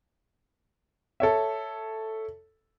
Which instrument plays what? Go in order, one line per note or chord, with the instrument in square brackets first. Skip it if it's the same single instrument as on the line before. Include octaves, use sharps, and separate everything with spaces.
[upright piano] A4 C#5 E5